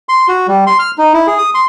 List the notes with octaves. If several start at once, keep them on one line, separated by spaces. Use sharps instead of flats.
C6
F#4
G3
C6
F6
D#4
E4
G#4
D#6
C6